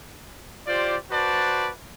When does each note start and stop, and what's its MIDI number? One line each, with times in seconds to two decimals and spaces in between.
0.67 0.96 65
0.67 0.96 67
0.67 0.96 72
0.67 0.96 74
1.11 1.70 66
1.11 1.70 71
1.11 1.70 72
1.11 1.70 74
1.11 1.70 81